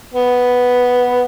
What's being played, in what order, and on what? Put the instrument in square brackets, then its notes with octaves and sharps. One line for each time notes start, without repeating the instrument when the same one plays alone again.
[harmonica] B3